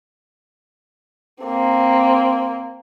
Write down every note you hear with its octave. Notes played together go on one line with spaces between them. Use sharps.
A#3 C4